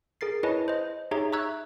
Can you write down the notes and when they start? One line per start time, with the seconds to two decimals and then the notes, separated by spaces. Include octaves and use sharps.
0.21 G#4 A#4 A6 C7
0.43 E4 B4 C#5 D#5 G#5 A5
0.68 C5 D#5
1.11 D#4 G4 G#4 C#5 E5 A#5
1.33 E5 A#5 C#6 E6 F#6 G#6